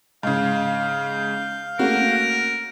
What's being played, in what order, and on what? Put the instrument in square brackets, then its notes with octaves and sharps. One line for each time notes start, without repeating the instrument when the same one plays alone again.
[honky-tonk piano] G#2 C#3 [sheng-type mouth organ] F5 G6
[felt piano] A3 A#3 C#4 [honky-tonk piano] F#4 [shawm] A#4